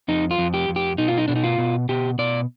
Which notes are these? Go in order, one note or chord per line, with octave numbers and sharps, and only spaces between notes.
F2 D#4
F4
F2
G4
F2
G4
B2 D#4
F4
D#4
B2 D4
D#4
F4
B2
B2 G4
B2 D5